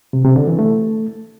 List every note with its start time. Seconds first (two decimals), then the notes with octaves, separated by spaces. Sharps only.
0.13 C3
0.25 C3
0.36 D3
0.47 E3
0.59 A3